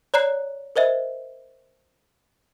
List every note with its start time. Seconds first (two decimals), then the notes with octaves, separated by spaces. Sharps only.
0.14 C#5 D5 A#5 F#6 C7
0.76 A#4 C5 D#5 E5